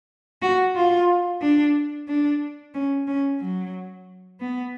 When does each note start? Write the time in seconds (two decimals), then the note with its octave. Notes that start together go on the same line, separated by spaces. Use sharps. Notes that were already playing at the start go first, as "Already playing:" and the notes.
0.42 F#4
0.75 F4
1.41 D4
2.08 D4
2.74 C#4
3.07 C#4
3.40 F#3
4.40 B3